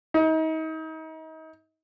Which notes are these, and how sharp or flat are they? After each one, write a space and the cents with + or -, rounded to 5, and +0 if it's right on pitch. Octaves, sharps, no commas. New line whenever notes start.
D#4 +35